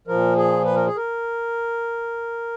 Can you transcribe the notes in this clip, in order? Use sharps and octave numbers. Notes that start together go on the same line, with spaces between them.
A#2 F3 A#4
G#4
B4
A#4
G#4
A#4